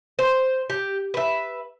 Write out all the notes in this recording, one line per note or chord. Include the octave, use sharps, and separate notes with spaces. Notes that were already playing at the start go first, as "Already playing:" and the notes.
C5
G4
B4 E5